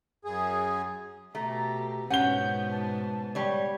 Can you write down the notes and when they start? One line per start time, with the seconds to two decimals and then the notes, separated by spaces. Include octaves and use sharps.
0.25 F#2 G#4
1.35 B2 A3 G4 A#5
2.10 G#2 B2 B3 C#4 F#5 G6 G7
2.71 A5
3.35 G3 C#5